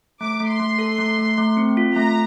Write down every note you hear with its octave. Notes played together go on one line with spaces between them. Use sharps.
A3 D6
A3
C6
A3
A4
A3
A3
A3
C4
F4
A3 A#5